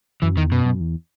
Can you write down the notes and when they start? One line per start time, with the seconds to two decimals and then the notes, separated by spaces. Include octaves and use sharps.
0.22 F#2 E3
0.36 E2 D#3
0.51 F#2 B2
0.65 F#2
0.80 E2